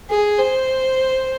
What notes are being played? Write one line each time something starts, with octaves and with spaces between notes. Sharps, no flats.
G#4
C5